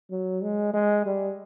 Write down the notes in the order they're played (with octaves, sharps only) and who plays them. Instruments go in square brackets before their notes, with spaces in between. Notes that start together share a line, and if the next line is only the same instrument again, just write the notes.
[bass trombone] F#3
G#3
G#3
G3